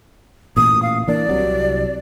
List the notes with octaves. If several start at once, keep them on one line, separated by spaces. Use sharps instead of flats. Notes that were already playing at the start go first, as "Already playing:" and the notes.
A1 A#2 D#6
F5
E3 A#3 D4 D5
C2 C3 F#3